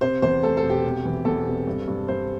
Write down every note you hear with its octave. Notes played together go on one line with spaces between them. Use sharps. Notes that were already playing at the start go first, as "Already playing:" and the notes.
C3 C5
E2 C5
A3 A4
A4
E1
G4
C3
E3
E2 A4
C3
G2
G2
G2 C5